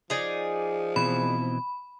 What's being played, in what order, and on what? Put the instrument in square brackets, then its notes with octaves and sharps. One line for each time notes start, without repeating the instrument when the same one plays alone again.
[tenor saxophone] F3 [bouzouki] D#4 G#4 D5
[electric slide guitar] B2 E3 C4 [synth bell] B5